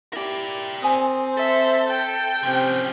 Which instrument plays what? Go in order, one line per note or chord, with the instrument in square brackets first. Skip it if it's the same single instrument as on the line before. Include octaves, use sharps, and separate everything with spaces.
[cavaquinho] E4 G4 [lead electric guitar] A#4 D5
[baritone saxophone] C4 [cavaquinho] G#5 D#6
[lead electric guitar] A4 [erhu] E5
[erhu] G5
[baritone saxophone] C3 [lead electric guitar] F3 C#4